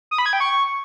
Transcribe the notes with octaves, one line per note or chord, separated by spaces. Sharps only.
D#6
B5
G#6
G5
C#6